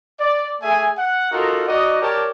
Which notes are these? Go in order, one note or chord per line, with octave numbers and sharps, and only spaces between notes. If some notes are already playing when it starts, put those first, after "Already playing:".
D5
A3 G#4 E5 G#5
F#5
D#4 F4 F#4 A4 A#4 F#5
D#4 F#4 D5 D#5
G4 A#4 C#5 D5 A5